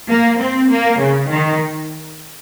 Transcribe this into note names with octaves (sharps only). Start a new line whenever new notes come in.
A#3
C4
A#3
C#3
D#3